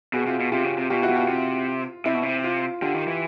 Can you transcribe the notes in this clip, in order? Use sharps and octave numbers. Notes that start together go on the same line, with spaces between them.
B2 F#4 G#4
C3 F4
B2
C3 F4 G4
C#3
C3
B2 F4 G4
E4 F#4
B2
F4 G4
C3 F4
C3 E4
B2
C3
F4
D3 F4 G4
D#3
E3